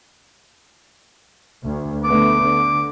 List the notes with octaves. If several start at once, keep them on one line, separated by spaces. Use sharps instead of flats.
D2
D3 A3 B3 D6
D3